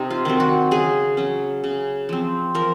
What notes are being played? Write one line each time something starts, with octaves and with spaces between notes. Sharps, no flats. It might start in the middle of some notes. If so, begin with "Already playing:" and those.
Already playing: C3 D#4
F4
D#3 F#3 C4
F#4
C#3 G#4
F#3 C#4
C#3
F3 C4
F3 A#4